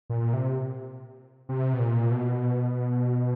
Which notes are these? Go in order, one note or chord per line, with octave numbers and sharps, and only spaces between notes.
A#2
C3
C3
B2
A#2
B2